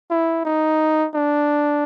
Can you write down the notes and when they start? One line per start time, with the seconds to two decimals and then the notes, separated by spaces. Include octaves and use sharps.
0.10 E4
0.45 D#4
1.15 D4